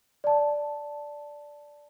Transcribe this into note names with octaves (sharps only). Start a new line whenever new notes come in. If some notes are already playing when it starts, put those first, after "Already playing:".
D5 A5